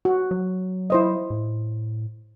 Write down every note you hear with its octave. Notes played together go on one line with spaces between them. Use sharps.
F#4
F#3
E4 C5 D#5
A2